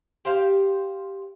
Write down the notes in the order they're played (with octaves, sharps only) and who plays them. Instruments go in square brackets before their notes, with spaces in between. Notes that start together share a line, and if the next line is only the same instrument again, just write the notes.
[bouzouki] G4 C5 F5 G5